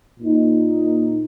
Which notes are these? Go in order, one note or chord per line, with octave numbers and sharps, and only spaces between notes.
A#2 A#3 D#4